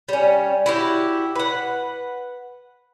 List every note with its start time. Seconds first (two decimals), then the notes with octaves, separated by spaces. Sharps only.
0.09 G3 C#4
0.66 E4 F#4 G4
1.35 B4 F#5